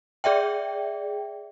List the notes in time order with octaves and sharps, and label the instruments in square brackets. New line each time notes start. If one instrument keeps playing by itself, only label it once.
[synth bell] G#4 D5 E5 G5